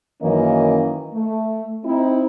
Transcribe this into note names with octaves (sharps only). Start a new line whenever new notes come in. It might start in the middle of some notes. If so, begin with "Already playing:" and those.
F#2 D#3 E3 A#3 C#4 D#5
A3
C4 D#4 E4